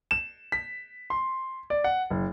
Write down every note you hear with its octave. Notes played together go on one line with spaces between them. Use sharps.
E7
B6
C6
D5
F#5
F#1